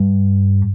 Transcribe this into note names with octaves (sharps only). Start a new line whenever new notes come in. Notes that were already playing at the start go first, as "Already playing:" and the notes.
Already playing: G2